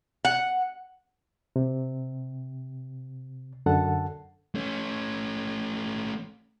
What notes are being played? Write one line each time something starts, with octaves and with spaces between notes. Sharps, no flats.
F#5
C3
F#2 D3 A4 F#5 A5
A3 C#4